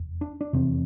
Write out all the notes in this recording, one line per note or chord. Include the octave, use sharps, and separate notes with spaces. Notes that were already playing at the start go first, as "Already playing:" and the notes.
Already playing: F1 E2
D4
D4
F1 E2 C3 C4